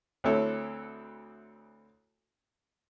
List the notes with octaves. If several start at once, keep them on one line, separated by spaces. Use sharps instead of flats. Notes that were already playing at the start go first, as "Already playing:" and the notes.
D2 C4 E4 A4 C#5